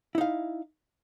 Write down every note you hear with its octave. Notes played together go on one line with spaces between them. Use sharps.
D#4 E4 F5